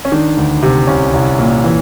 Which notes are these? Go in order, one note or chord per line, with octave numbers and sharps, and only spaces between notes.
C#4
D#3 D4
D2
C3
C2 C#4
C2
A#2
E3